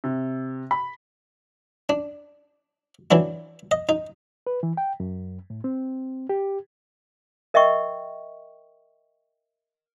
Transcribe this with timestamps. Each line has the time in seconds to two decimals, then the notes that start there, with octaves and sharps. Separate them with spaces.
0.04 C3
0.71 B5
1.89 D4
3.11 E3 F#3 D4 E4
3.71 D#5
3.89 D#4
4.47 B4
4.63 E3
4.77 G5
5.00 F#2
5.50 A2
5.64 C4
6.29 G4
7.54 A#4 D#5 E5 G5 C#6